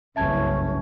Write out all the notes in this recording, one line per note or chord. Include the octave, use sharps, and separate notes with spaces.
F#1 C2 G2 C#4 E5 A5 G#6